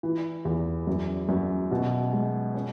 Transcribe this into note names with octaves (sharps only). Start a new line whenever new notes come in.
E3
E2
F#2
F#2
B2
G#3
C#4